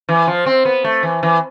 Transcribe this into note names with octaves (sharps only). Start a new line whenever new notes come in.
E3
F3
C4
B3
A3
E3
E3